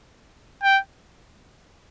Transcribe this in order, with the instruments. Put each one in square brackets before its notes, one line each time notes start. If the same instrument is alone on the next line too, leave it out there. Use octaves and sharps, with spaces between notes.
[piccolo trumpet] G5